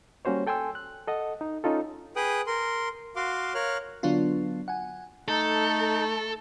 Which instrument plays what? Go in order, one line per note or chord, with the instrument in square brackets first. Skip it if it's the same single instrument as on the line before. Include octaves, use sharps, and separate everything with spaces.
[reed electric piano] G3 A#3 C#4 F#4 C5 C#5
A4 G5 G#5 C6 E6
F#6
A4 D#5 F#5
D#4
C#4 D#4 F4 A4
[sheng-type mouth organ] G#4 B4 G5 D#6 F#6
A#4 C6
F#4 F5 C6 D6
A#4 C#5 F5 F6 F#6
[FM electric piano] D3 F#3 B3 D4 F4
F#5 G#5
[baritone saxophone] A3 [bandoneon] D#4 [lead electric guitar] A4